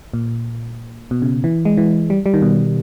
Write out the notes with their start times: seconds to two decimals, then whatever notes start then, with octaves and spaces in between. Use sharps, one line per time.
0.14 A#2
1.11 B2
1.22 C#3
1.44 E3
1.65 G#3
1.77 E3
2.10 G3
2.26 G3
2.34 D#3
2.42 B2